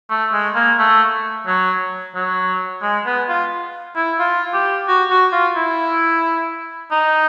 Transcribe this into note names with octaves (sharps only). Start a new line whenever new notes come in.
A3
G#3
A#3
A3
F#3
F#3
G#3
B3
F4
E4
F4
G4
F#4
F#4
F4
E4
D#4